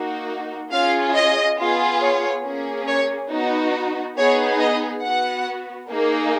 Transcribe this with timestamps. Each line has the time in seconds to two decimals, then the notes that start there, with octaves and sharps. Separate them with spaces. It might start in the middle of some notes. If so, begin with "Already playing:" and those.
Already playing: A#3 D#4 F#4
0.72 C#4 F4 G#4 F5
1.15 D#5
1.58 B3 F4 G#4
2.00 C#5
2.44 A#3 C#4 G#4
2.87 C#5
3.30 B3 D#4 F#4
4.17 B3 D#4 G#4 C#5
4.60 D#5
5.03 B3 F#4 F#5
5.90 A#3 D#4 G#4